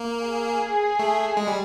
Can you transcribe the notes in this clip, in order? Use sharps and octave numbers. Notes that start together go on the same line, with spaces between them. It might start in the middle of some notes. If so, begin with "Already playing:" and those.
Already playing: A#3
G#4
A3
G#3
G3